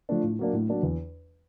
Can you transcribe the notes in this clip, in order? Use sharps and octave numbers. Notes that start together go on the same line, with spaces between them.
F3 A3 D4
A2
F#3 A#3 D4
A2
F#3 A#3 D4
E2